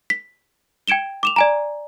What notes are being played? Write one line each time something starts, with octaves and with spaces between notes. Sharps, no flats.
B6
G5 G#6 D7 E7 G7
D6 E7 F7
D5 G#5 A#5